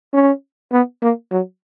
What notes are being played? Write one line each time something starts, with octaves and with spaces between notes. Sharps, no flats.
C#4
B3
A#3
F#3